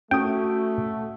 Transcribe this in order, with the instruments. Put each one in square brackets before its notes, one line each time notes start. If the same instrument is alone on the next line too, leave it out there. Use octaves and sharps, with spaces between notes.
[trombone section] A3 [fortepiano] C#4 D#6 [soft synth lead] F#4 [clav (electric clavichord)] G5